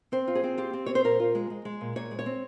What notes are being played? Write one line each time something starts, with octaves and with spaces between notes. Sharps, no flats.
C4 C5
F4
G#4
C4
F4 G4
C4
C4 C#5
C5
A#2 A#4
F4
G#3
G#3
G#3
A#2
A#2 C#5
G#3
C#5
C4